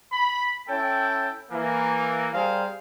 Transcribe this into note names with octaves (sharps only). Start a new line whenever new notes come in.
B5
C#4 E4 A4 G5
E3 A#3
G3 C4 G#4 A#4 C5 F5